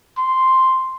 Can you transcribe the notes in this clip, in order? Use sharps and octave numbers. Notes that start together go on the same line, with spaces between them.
C6